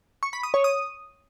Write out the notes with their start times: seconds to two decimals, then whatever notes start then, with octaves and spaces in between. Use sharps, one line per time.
0.23 C#6
0.33 B5
0.43 D#6
0.54 C#5
0.64 D#6